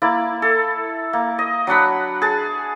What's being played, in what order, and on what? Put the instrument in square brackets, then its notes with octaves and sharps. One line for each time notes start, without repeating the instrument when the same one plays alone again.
[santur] A#3 E4 D5
A4
A#3
D#5
F#3 D4 F#5 B5
G#4 A5